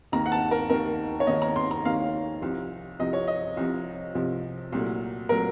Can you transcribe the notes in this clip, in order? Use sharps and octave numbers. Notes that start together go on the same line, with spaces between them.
D#2 D#3 A#3 A#5
F#5
A5
A#4
D#2 D#3 A#3 A#4
C#5
D#2 D#3 A#3 D#5
A#5
C6
A#5
D#2 D#3 A#3 F5
C2 C3 F3
C2 C3 F3 D#5
C#5
D#5
C2 C3 F3
C2 C3 F3
C2 A#2 F#3 A3
A#2 F#3 A3 A#4